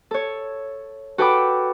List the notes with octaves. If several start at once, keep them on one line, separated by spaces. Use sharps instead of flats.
A4 C#5
F#4 A4 B4 G5 B5 D6